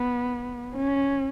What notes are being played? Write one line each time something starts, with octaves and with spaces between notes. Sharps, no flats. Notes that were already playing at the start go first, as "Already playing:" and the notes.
Already playing: B3
C#4